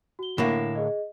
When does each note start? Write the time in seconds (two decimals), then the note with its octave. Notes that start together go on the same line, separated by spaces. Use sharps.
0.19 F#4 G7
0.38 A2 D3 A#3 E4 A#6 E7
0.75 G#4 D#5